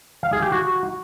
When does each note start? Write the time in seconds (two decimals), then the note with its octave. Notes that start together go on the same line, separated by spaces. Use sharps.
0.23 F5
0.33 G#4
0.42 G4
0.52 F#4